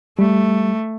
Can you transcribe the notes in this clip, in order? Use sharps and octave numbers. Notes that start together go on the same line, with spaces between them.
G3 A3